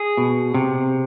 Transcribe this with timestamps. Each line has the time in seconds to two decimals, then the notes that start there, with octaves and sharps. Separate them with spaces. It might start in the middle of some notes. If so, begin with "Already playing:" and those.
Already playing: G#4
0.17 B2
0.54 C3